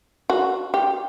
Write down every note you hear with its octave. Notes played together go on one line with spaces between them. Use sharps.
F#4
G4